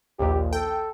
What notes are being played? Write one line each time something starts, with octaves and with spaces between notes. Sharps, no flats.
A#1 D#2 G4
A4 G5